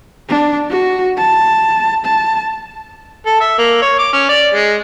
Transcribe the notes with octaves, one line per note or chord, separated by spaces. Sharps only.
D4
F#4
A5
A5
A4
E5
A#3
C#5
D6
C#4
D5
G#3